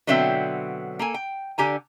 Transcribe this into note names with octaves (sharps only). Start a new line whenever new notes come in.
B2 D3 F#3 C4 E5 G5
A#3 A4 G#5
G5
D3 G4 G#5 A#5